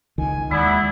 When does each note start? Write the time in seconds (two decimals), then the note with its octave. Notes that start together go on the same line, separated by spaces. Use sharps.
0.18 C#2 D#3 G#5
0.51 D#2 G#3 B3 E4 D5